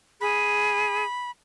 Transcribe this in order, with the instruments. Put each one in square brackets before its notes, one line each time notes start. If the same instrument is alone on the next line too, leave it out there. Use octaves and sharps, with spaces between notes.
[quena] G#4 [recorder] B5